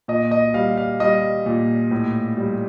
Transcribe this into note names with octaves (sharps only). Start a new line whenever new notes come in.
A#2 D#5
D#5
G3 F5
F5
G3 D#5
A#2
A2
G3